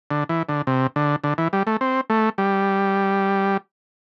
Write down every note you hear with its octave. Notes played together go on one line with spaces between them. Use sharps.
D3
E3
D3
C3
D3
D3
E3
G3
A3
C4
A3
G3